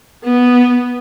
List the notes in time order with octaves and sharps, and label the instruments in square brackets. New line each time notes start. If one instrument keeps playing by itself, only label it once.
[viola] B3